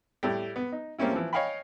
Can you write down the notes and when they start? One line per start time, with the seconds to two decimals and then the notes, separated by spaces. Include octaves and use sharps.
0.23 A2 G3
0.56 B3
0.72 D#4
0.98 G3 A#3 C4 C#4 E4
1.12 E3 F3
1.33 C#5 D#5 F5 G5 G#5 B5